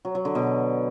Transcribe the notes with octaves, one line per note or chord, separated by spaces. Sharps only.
F#3
F#3
D3
B2